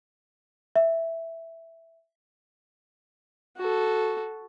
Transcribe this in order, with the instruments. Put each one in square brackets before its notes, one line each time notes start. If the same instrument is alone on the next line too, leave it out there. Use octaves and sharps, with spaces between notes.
[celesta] E5
[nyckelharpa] F#4 A4